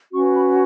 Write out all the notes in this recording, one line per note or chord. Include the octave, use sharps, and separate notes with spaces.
C#4 F#4 B4 C#6
B5